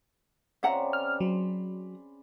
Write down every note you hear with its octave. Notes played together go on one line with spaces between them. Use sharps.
C#3 C4 D5 E5 F#5 A#5
F6
F#3 B5 C6